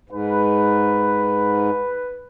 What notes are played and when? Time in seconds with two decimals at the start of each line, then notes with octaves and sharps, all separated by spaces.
0.10 G#2 B4